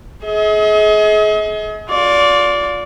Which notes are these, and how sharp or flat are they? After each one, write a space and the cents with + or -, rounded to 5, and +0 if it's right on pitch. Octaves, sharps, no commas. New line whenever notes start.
G#4 +35 D#5 +45
F4 +25 D5 -20